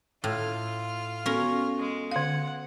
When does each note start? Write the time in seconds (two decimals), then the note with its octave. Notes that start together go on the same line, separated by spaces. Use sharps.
0.24 A2 F4 F6
1.26 B3 C#4 F#4 A4 A#4
1.78 G#3
2.11 D3 F5 F#5